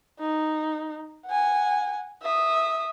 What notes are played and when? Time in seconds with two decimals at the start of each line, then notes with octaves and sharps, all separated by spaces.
0.20 D#4
1.26 F#5 G#5
2.23 E5 D#6